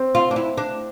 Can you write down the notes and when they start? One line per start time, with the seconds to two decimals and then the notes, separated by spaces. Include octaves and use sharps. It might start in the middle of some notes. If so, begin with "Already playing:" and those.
Already playing: C4
0.15 F4
0.31 D4
0.36 E4
0.58 D4